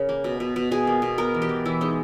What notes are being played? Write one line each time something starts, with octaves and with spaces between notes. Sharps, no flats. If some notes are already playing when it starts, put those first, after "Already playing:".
Already playing: C#3 A#4
A#3
B2
B2
B2
B2 G#4
A#3
B2
B3 A#4
E3
G4
E3
E3 E4
G#3 D#4